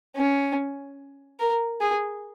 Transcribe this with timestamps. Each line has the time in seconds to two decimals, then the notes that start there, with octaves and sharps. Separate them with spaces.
0.17 C#4
1.39 A#4
1.81 G#4